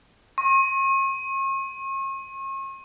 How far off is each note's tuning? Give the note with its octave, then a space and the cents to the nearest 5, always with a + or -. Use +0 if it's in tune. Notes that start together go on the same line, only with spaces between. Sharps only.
C#6 -40